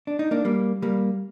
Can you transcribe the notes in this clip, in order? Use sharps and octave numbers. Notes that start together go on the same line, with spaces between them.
D4
D#4
A#3 D4
G3 A#3
G3 A#3